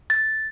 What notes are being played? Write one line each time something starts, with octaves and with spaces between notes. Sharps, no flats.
A6